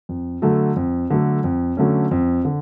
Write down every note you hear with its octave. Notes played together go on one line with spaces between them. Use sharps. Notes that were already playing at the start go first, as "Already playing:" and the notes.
F2
D3 F#3 A3
F2
D3 F#3 A3
F2
D3 F#3 A3 C#4
F2
D3